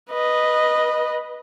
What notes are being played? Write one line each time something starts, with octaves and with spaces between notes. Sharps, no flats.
B4 D#5